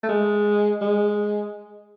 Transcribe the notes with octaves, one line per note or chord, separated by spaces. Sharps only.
A3
G#3
G#3